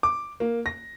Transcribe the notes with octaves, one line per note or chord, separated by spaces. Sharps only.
D6
A#3
A#6